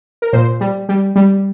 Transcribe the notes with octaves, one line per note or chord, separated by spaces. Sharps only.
A#4
A#2 C5
G3
G3
G3